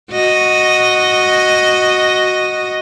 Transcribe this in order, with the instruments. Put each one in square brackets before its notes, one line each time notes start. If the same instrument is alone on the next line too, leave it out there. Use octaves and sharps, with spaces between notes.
[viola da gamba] F#4 D#5